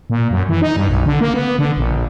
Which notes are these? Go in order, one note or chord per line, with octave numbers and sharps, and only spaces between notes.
A#2
F#2
E3
D#4
G2
B1
D3
A#3
B3
D3
A#1